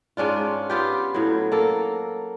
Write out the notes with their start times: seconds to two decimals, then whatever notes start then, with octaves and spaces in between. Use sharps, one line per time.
0.17 G#2 C#4 D4 F4
0.70 B3 F4 G4
1.14 A2 F#3
1.52 A#3 A4